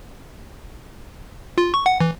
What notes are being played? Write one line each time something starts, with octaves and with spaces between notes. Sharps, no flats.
F4
C#6
F#5
E3